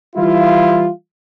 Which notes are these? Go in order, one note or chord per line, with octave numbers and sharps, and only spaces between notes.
E3 G3 E4 F4